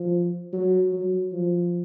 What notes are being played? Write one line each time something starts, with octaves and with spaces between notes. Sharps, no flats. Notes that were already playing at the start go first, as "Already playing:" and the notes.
Already playing: F3
F#3
F#3
F3